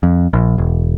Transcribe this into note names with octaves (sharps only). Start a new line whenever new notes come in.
F2
A#1
E1